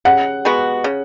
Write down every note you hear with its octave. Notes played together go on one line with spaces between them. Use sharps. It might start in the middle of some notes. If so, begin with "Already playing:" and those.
C#3 F#5
G#3 B3 F#4
C#3